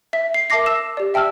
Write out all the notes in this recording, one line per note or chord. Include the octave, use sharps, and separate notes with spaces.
E5 B6
C7
A#4 E5 A5 D6 A#6 C7
E6 E7
G4 D5
E5 G5 A5 E6 F6